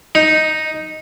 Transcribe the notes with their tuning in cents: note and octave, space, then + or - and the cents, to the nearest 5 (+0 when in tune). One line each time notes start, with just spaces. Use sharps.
D#4 +0